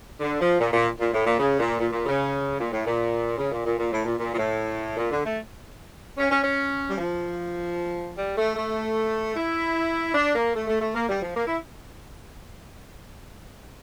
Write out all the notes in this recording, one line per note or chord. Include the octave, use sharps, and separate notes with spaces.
D3
F3
A#2
A#2
A#2
A2
A#2
C#3
A#2
A#2
A#2
C#3
A#2
A2
A#2
C#3
A#2
A#2
A#2
A2
A#2
A#2
A#2
A2
A#2
D3
A3
C#4
C#4
C#4
G3
F3
G3
A3
A3
E4
D4
A#3
A3
A3
A3
A#3
G3
F3
A#3
E4